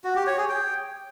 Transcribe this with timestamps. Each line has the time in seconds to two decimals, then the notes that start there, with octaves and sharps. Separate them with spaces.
0.04 F#4
0.15 G4
0.27 C#5
0.38 G#4
0.49 G5